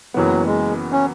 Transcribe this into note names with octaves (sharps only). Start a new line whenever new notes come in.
F#1 F#2 E3 F#3 B3
G#3
C#4